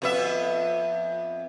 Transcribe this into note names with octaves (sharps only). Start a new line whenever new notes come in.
F2 B3 E5